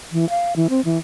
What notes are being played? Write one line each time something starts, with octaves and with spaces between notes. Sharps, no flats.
E3
F5
E3
C4
E3